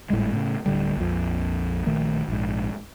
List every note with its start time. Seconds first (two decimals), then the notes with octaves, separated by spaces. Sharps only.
0.10 G#1 A2 G3 G#3
0.33 A2 C#3
0.66 D1 A2 D3 G3
0.96 A#1 F2
1.86 A#1 D#3 A3
2.28 A#1 G#2